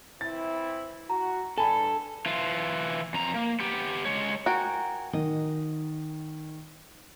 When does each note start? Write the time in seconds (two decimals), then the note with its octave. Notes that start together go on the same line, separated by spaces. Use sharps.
0.21 E3 C4 E4 A6
1.10 F#4 A#5
1.58 G2 A4 G#5 B5
2.26 E3 F4
3.14 F2 A#5
3.35 A#3
3.60 B3 G4
4.05 G#3 C#5
4.46 F#4 A#4 G5 G#5
5.13 D#3 D#5